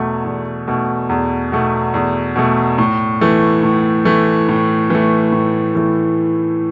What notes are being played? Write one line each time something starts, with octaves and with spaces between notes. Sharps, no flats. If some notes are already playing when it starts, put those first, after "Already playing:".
Already playing: E2 B2 A3
E2
B2 A3
E2
B2 A3
E2
B2 A3
A2
E3 A3
A2
E3 A3
A2
E3 A3
A2
E3 A3